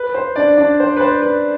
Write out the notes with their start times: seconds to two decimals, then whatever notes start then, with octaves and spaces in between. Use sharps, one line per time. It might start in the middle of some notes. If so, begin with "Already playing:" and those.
Already playing: B4
0.14 C5
0.36 D4 D5
0.57 D4 D5
0.80 C5
0.97 B4
1.01 C5
1.22 B4